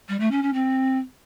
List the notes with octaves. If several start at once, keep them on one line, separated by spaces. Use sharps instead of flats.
G3
A3
C#4
C#4
C4